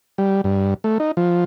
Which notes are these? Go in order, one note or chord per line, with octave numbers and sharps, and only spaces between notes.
G3
G2
A3
D#4
F3